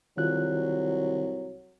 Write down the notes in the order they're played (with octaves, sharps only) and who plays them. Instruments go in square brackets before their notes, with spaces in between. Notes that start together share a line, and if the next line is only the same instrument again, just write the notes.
[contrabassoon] C2 [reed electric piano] D#3 F4 F#6 [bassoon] F#3